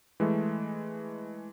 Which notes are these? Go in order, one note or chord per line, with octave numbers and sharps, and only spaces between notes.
E3 G#3 A3